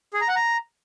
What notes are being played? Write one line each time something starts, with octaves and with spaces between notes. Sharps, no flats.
G#4
A#5
F#5
A#5